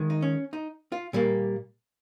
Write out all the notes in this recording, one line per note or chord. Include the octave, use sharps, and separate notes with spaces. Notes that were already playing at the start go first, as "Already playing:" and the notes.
Already playing: D#3 G#3
D#4
C#4
D#4
F4
A#2 G3 A#3